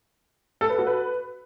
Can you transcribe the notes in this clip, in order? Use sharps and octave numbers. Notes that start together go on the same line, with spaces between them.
A4
B4
F#4
B4